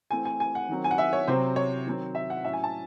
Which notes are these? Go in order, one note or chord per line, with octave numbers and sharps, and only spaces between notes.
E3 A3 C4 G#5
G#5
G#5
F#5
D#3 F#3 C4
G#5
F#5
E5
C#5
C3 F#3 C4 C5
C#5
D#3 F#3 C4
E5
F#5
A2 F#3 C#4 E5
G#5
A5